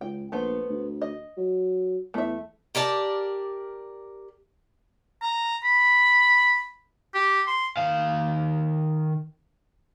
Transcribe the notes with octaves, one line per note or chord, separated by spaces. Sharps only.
C#2 G5
A#1 A3 B3 C5
D2
D#5
F#3
E2 A3 E5
G4 A#4 D5 A5
A#5
B5
G4
C6
D#3 F5